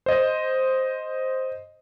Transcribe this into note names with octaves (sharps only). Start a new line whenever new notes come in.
C5 D#5